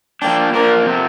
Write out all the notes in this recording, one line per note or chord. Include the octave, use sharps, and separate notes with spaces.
F3 A#3 D4 G5
F3 A#3 D4 A#4
C3 F3 C4